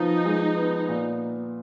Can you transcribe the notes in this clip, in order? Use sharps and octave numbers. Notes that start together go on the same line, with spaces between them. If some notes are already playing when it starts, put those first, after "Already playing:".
Already playing: F3 B3 D#4
G#3
B3
A#2